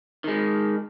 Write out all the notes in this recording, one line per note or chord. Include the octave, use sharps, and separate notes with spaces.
D#3 G#3